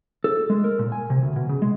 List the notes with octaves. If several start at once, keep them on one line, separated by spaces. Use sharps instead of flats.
A4
G#3
A#4
A#2
G#5
C3
D2
B2
C#3
G#3